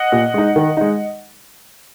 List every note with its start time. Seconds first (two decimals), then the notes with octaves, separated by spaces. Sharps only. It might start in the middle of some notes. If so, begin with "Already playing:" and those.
Already playing: D#5 F#5
0.12 A#2
0.34 G#3 D#4
0.56 D#3
0.77 G#3 D#4